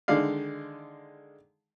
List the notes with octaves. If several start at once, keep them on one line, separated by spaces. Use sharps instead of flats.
D3 D#3 G#3 D5 F5